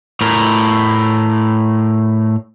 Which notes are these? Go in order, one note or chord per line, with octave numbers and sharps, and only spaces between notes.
A2 A#4